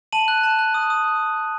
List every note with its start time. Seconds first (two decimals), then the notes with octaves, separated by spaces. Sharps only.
0.12 A5 D#7 F#7
0.28 F#6
0.43 A5
0.59 F#6
0.74 D#6
0.90 D#6